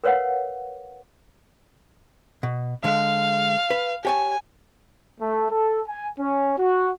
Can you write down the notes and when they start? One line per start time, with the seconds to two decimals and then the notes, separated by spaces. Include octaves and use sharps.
0.04 A#4 B4 C#5 F5 F#5
2.43 B2
2.84 D3 G#3 F5
3.70 B4
4.05 G4 C#5 G#5 A5
5.19 A3
5.50 A4
5.88 G#5
6.18 C#4
6.57 F#4